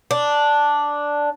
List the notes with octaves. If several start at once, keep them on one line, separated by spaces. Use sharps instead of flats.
D4